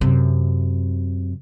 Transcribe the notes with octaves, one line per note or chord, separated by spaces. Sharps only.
F#2 C3